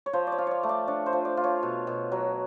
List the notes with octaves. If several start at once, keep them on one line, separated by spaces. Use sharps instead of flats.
C#5
F3 C5
D5
C#5
F4
C#5 D5
A3
D5
D4 C#5
C5
F3
D5
F4
C#5
B2
B2
F#3